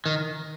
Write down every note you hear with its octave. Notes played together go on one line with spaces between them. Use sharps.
D#3